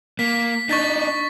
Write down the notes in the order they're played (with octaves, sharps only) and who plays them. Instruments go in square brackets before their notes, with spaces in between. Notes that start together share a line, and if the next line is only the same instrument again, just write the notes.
[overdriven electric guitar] A#3 [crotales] B6
[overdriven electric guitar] D4 D#4 [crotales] C#6 A6 B6